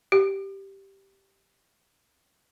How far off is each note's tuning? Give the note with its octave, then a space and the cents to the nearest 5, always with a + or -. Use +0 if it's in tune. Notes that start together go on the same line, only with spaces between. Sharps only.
G4 -5